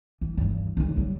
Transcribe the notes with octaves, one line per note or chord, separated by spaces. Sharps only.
E3
E2 G2
D2 D#3
F#3 G3